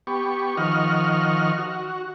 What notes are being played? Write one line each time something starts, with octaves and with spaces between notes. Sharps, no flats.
B3 G4 C#6
D#3 F3 D#5 F#5 C#6 F6
F#4